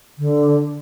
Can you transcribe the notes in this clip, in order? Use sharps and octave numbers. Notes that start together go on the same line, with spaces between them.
D3